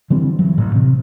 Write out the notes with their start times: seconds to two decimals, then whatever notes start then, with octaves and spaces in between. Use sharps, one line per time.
0.10 D3 E3 G3 C4
0.39 E3 F#3
0.58 A1 A2
0.75 C3